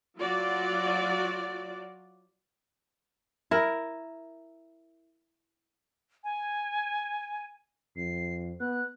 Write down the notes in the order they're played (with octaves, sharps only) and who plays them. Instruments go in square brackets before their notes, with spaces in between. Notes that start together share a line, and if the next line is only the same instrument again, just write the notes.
[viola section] F#3 F4 F#4 D5
[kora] E4 A#4
[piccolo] G#5
[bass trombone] F2 [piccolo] C7
[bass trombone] B3 [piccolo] F#6